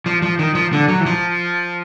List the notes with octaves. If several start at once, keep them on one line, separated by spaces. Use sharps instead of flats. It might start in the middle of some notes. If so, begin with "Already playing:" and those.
F3
F3
D#3
F3
D3
F#3
E3
F3